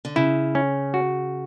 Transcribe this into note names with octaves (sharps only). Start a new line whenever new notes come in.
D3
C#3 E4
C#4
F#4